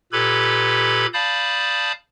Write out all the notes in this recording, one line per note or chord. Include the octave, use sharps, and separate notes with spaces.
A#2 G4 A4 B4 B5 G#6
D5 F5 A5 B5 D#6 G6